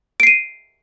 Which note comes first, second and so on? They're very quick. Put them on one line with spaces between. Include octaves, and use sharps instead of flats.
D7 C7 D#7